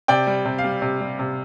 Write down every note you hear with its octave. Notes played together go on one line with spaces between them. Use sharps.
C3 D5 G5
G3
C3
F5
G3
C3
G3
C3